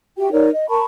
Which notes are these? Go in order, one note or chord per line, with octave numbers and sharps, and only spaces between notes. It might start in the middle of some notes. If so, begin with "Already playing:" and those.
F#4 G4 E5 G5
D#4 A#4 C#5 D5
D#5
A#4 A5 B5 C#6